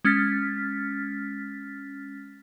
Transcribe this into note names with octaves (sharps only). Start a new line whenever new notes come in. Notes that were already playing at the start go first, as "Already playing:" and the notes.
G#3 C#4 F6 A6 B6